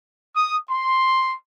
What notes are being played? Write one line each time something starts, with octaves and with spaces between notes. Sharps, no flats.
D#6
C6